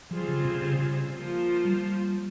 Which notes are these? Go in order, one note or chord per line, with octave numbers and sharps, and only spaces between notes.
F3 G3 C4 F4 G#4 C5
C#3
C3
C#3
C#3
F3 A#3 F4 C5
G3